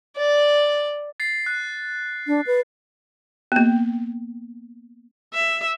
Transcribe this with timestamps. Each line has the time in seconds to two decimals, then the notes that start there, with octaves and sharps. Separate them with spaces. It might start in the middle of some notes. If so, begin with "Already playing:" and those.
0.17 D5
1.20 A6 C7
1.46 F#6
2.27 D4
2.47 B4
3.52 A#3 B3
5.34 E5